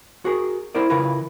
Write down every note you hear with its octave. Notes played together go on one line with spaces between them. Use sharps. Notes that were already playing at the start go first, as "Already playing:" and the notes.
F#4 G#4 A#4
E4 A#4 C5 D5
C#3 E3 F4 A#4 B4